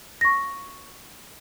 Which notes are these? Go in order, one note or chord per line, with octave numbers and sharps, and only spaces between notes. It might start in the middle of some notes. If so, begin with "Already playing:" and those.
C#6 A#6